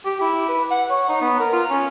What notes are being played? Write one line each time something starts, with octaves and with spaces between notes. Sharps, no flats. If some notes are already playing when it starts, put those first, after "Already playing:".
G4
E4
B4
F#5
C#5
D#4
B3
A#4
F4
C#4